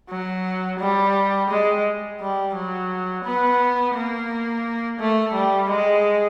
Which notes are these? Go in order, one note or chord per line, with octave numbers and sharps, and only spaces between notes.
F#3
G3
G#3
G3
F#3
B3
A#3
A3
G3
G#3